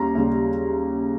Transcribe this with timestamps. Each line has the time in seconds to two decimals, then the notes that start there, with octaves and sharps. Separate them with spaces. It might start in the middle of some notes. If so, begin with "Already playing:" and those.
Already playing: D#2 C#3 G3 A#5 C6
0.15 D#2 C#3 G3